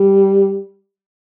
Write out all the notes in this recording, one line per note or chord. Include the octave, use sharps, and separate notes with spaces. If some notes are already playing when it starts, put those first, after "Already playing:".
Already playing: G3